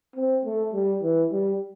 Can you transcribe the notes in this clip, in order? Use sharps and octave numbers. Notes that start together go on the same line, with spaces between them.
C4
A3
G3
E3
G3